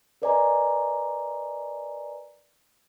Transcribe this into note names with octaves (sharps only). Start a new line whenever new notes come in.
A#4 B4 D5 D#5 G#5 A#5